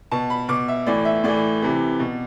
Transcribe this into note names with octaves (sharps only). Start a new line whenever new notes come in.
B2 A5
B5
B2 D6
E5
A2 E3 D5
E5
A2 E3 D5
C3 E3
B2